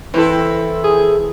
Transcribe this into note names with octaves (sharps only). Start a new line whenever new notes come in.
E3 C4 E4 A4
G#4